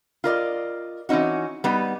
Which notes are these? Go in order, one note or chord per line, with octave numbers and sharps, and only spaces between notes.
F4 A#4 D5 D#5
E3 C4 C#4 D#4 F#4
G3 B3 D#4